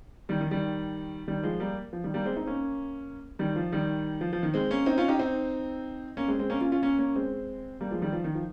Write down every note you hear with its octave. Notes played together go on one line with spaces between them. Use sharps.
D#3 G3
D#3
D#3 G3
D#3 G3
F3 G#3
G3 A#3
F3
D#3 G3
G3 A#3
G#3 C4
C4 D#4
A#3 C#4
D#3 G3
F3
D#3 G3
F3
F3
D#3
G#3 C4
A#3 C#4
C4 D#4
C#4 F4
D#4 G4
C4 D#4
A#3 C#4
G#3 C4
G#3 C4
A#3 C#4
C#4 F4
C#4 F4
A#3 C#4
A#3 C#4
G#3 C4
G3 A#3
F3 G#3
D#3 G3
F3
D#3
F3